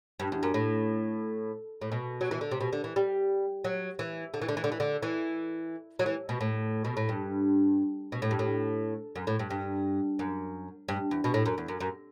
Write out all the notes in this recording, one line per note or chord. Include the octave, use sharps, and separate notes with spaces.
G2
E2
F#2
A2
A2
B2
F#3
E3
D3
C3
B2
D3
E3
G3
F#3
E3
D3
E3
D3
E3
D3
E3
D3
E3
F#3
E3
B2
A2
B2
A2
G2
B2
A2
G2
A2
F#2
A2
G2
G2
F#2
G2
E2
B2
A2
F#2
E2
F#2
F#2